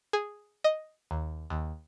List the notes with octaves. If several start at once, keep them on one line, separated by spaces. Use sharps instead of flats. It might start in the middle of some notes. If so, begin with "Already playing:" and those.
G#4
D#5
D#2
D#2